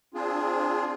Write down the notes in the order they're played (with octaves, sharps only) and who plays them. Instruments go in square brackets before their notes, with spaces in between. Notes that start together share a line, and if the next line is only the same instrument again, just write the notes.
[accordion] C4 D4 F4 G#4